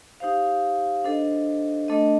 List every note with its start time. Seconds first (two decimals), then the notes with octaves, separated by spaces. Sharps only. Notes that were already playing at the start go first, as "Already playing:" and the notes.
0.20 D#4 G4 C5 F5
1.04 D4 A4 C5 D#5
1.88 A3 D4 A4 D#5